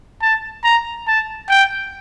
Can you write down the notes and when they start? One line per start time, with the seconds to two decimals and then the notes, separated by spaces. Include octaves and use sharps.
0.22 A5
0.64 A#5
1.08 A5
1.50 G5